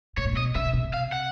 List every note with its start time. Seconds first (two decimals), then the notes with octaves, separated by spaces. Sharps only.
0.17 B2 C#5
0.25 A#2
0.33 B2 D#5
0.55 C#3 E5
0.65 C3
0.73 B2
0.83 C3
0.93 F5
1.12 F#5